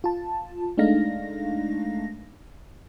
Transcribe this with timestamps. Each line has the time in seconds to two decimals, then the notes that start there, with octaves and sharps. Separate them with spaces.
0.04 F4 A5
0.78 G#3 A3 D4 D#4 F5 A#6